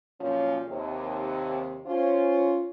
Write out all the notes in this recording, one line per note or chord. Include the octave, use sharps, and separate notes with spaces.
F#2 A#2 F3 C#4
D#2 C3
C#4 F4 C5